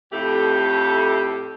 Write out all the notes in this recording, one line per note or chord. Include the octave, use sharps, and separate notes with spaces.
F2 A2 A3 G4